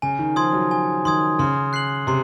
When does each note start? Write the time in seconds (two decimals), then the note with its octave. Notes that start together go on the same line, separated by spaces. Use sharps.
0.02 C#3 G#5
0.19 D#3
0.36 F3 C6 D#6 G#6
0.53 F#3
0.71 G#5
1.05 D#3 C6 D#6 G#6
1.39 C#3 C6
1.73 F#6 C7 F#7
2.07 C3 C6